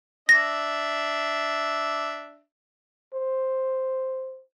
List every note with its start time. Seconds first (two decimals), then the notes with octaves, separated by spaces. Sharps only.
0.29 D4 E5 A#6
3.14 C5